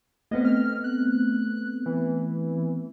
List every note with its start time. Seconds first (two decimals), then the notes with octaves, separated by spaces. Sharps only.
0.31 A3 B3 C4 D#5
0.45 F6
0.84 F#6
1.86 E3